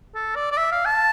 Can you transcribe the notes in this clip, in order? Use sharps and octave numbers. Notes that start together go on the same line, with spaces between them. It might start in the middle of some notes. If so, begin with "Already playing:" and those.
A4
D5
D5
E5
F5
A5